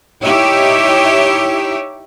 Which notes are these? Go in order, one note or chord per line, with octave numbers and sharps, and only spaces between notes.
D#4 E4 G4 C#5 E5